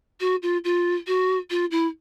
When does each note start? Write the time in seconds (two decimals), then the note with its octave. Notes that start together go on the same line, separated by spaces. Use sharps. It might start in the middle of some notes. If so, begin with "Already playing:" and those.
0.20 F#4
0.43 F4
0.64 F4
1.07 F#4
1.50 F4
1.71 E4